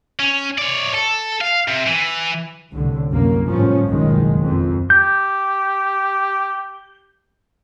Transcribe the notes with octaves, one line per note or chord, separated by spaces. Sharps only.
C#4
C#5 D5
A4
F5
C3
E3
C2 A2 D3
C2 F#2 A#3
G1 A2 F3 C#4
F#1 B1 B2 D#3 G#3
F2
G4 G6